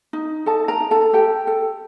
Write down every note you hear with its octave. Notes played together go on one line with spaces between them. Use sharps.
D#4
D#4 A4 A5
A#4 A#5
D#4
A4 A5
G4 A4 G5
A4